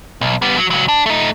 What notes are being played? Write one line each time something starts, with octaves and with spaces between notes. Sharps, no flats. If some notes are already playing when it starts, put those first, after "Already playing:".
B1
G3 B3
F#3
C#2 F#3
D4
A3 D#4